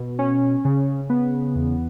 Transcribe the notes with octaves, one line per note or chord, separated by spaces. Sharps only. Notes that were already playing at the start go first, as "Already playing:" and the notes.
Already playing: B2
C#4
C#3
B3
E2